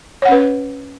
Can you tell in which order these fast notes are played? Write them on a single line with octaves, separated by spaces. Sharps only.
C#5 F#5 C#4 B4